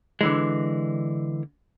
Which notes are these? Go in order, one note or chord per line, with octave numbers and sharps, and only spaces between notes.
D3 E3 G#3